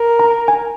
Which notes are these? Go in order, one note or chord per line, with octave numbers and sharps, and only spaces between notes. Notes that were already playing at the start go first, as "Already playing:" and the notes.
Already playing: A#4
A#5
G#5